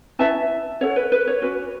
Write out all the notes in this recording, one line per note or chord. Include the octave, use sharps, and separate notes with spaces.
C#4 E4 B4 E5 A5
C#4 A4 C#5 F#5
B4
B4
C#5
C#4 F#4 B4